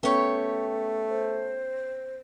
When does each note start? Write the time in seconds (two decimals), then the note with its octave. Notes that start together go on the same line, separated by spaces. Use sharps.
0.03 A3 B3 C#4 G4 B4 C#5
1.09 C5